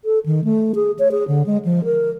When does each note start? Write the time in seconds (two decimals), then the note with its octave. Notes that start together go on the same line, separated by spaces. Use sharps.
0.05 A4
0.26 D#3
0.44 A3
0.75 G#4
0.99 C#5
1.11 G#4
1.28 D3
1.46 G#3
1.65 F3
1.85 A#4